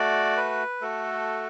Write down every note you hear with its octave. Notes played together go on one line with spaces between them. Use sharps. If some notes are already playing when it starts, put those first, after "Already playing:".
Already playing: A3 F#4 D5
B4
A3 F#4 A4